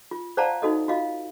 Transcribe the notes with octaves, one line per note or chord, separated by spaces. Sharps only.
F4
C5 D5 F5 F#5 A5 A#5
D#4 F#4 A4 D#5
F4 F#4 D#5 F5